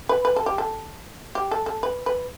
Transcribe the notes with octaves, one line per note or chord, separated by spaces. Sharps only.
B4
B4
A4
G4
A4
G4
A4
A4
B4
B4